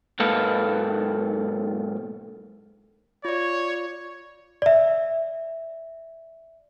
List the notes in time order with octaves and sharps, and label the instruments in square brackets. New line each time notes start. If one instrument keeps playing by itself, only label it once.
[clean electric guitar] B1 G#2 A#3 A4 B4 F5
[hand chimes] F4 D5 [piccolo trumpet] C#5
[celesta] D5 E5